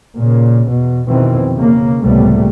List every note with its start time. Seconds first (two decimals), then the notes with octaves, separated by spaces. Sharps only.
0.17 A#2 C#3
0.68 E2 B2
1.06 F2 B2 D#3 E3 C4
1.54 C#3 A#3
2.02 C#2 A2 C3 G3 A3 B3